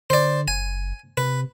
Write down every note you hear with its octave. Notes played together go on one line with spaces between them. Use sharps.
D3 C5 D5
F#1 G#5
C3 B4